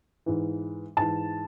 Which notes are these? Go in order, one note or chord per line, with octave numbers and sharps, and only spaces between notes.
G#2 E3
G#2 E3 A5